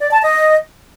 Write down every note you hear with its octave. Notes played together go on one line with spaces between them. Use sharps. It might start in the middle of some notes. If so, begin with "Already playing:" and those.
D5
A5
D#5